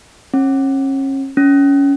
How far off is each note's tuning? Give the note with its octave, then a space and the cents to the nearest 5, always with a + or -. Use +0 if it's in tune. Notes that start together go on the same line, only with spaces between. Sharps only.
C#4 -35
C#4 +15